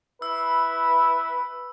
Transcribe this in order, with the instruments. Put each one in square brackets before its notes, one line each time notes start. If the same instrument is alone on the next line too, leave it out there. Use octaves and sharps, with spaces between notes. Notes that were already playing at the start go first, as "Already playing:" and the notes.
[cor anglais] E4 [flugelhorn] B4 [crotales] E6